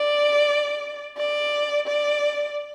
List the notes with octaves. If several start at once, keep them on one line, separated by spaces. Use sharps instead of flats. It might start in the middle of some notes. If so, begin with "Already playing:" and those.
Already playing: D5
D5
D5